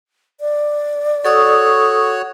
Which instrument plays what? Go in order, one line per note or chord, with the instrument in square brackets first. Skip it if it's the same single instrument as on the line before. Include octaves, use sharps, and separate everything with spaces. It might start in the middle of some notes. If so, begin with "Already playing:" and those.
[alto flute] D5
[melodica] F#4 C#5 [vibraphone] A4 D#6 E6